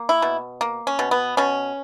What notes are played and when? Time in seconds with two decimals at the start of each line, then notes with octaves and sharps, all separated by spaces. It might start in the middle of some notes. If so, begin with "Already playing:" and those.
Already playing: A#3
0.09 E4
0.22 B2
0.61 A#3
0.87 C#4
0.99 B2
1.11 B3
1.37 B2 C#4